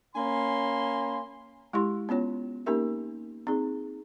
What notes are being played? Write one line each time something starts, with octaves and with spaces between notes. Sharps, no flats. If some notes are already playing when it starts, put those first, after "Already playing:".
A#3 C#4 G#5 B5 C6
G#3 E4 G4 C6
B3 C#4 F4 C#5
A#3 C#4 D#4 G4 A#4 E5
C4 D#4 G#4